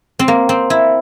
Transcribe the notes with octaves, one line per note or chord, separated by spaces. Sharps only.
C4
A#3
C4
E4